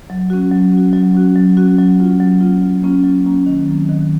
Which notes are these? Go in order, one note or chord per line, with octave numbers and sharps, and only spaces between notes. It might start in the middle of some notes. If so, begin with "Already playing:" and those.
F#3
C#4 F#4
F#3
C#4 F#4
F#3
C#4 F#4
F#3
C#4 F#4
F#3
A#3 C#4 F4
F#3
A#3 C#4 F4
F#3
A#3 C#4 F4
F#3
A#3 C#4 F4
D#3
F#3 C4
D#3